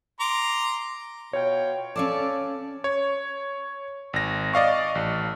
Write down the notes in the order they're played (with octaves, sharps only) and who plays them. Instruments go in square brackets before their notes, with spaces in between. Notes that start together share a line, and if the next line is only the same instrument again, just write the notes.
[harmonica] A#5 C6 D6
[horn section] B2 F4 G5 [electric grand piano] C#5
[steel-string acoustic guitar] C#4 F5 A5 [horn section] A4 D5
[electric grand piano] C#5
G#1 A#6
D5 D#5 F5 C#6
A1